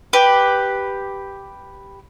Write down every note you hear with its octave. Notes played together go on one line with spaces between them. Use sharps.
G4 B4